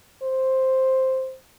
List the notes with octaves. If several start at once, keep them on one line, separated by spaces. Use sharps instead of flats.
C5